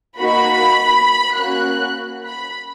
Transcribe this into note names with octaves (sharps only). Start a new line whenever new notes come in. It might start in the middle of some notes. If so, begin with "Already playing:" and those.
A#3 D#4 F#4 B5
A#3 C#4 F#4 F#6
B5